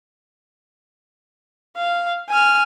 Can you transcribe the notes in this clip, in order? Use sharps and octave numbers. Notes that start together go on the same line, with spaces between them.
F5
G#5 F6